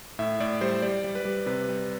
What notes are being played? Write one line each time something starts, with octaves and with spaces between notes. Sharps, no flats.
A2 E5
A2 D5
G3 C5
G3 D5
G3
B4
G3
C3 B4
G3